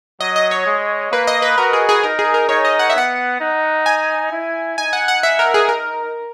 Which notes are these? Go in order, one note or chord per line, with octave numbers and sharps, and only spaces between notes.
F#3 D#5
D#5
C#5
G#3
A#3 B4
D#5
B4
F#4 A#4
G#4
G#4
D#4 A#4
G#4
A#4
D#4 C#5
D#5
F#5
E5
B3 F#5
D#4
G#5
E4
D#4 G#5
F#5
F#5
E5
A#4
G#4
A#4